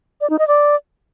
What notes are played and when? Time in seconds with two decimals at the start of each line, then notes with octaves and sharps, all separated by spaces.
0.21 D5
0.30 D#4
0.39 D#5
0.48 D5